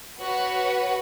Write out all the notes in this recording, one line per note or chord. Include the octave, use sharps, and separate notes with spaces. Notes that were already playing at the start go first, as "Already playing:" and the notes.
F#4 B4 C#5 F#5